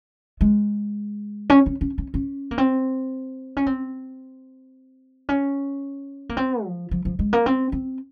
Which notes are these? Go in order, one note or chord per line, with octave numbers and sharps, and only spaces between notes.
G#3
C#4
C#4
C#4
C#4
C#4
A#3
C4
C#4
C4
C#4
A#3
C4
F3
F3
F3
G#3
A#3
C4
C4